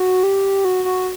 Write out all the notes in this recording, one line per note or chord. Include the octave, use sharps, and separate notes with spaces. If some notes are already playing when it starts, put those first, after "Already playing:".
Already playing: F#4
G4
F#4
F#4